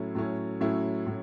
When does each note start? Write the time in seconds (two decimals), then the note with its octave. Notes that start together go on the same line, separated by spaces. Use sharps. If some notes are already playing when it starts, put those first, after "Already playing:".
Already playing: A2 F#3 A3 C#4 E4
0.15 A2 F#3 A3 C#4 E4
0.61 A2 F#3 A3 C#4 E4
1.06 A2 F#3